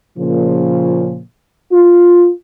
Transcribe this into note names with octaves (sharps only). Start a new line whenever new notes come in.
A#2 C#3 F3
F4